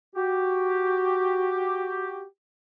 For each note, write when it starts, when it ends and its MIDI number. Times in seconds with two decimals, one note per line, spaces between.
0.16 2.25 66
0.16 2.25 67